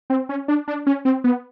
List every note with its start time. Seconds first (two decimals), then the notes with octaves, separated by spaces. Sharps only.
0.10 C4
0.29 C#4
0.48 D4
0.68 D4
0.87 C#4
1.05 C4
1.24 B3